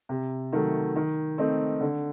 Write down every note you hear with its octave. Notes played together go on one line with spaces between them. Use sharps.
C3
D#3 F#3 A3
D#3
A3 C4 D#4
D3